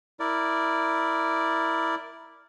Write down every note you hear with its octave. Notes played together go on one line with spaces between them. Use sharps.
E4 A#4 D5